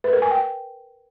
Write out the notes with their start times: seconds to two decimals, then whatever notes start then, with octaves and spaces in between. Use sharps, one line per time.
0.04 B4
0.13 A#4
0.22 G#5
0.31 G5